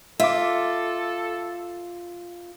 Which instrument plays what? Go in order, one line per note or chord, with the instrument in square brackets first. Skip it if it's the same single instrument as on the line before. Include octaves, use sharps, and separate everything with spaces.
[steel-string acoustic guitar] F4 [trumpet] A4 [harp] E5 D6